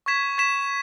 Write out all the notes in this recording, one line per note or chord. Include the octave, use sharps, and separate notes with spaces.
C#6 G#6 B6 E7
C#6 G#6 B6 E7